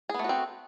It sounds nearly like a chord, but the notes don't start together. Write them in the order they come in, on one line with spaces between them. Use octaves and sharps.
G#4 B3 A3 F#4 C4